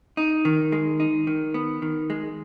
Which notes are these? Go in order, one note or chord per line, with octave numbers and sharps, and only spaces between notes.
D#4
D#3
G#3
D#4
D#3
B3
D#3
G#3